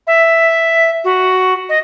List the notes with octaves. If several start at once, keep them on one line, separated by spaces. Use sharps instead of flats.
E5
F#4
D#5